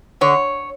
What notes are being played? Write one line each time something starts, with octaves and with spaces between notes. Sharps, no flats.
D3 C#5